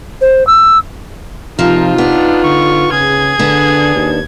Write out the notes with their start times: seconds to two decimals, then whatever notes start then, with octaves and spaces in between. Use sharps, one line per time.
0.21 C5
0.47 E6
1.59 C3 F3 D#4 F4 A#4
1.98 B3 D4
2.44 D3 C#6
2.92 C#3 G#4 G#6
3.39 D3 B3 D4
3.95 D#2